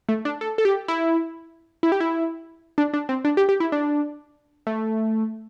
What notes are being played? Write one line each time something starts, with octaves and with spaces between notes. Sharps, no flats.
A3
D4
A4
A4
G4
E4
E4
G4
E4
D4
D4
C4
D4
G4
G4
E4
D4
A3